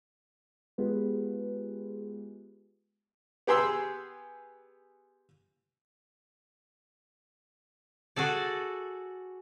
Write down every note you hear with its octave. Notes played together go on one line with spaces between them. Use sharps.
G#3 B3 F4 G4 G#4 B4
B3 G4 G#4 C6 E6
F#4 G#4 A4 D5